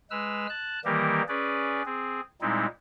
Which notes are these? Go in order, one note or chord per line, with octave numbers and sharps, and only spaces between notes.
G#3 B4 E6 F6
A5 F#6
D#3 E3 G3 A#3 G4 A#4
C#4 G#4 B4 D5
C4 G#4
A#2 G3 G#3 C4 D#4 E4